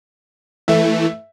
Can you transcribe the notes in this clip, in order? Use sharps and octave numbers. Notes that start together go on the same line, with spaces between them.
E3 A3 E5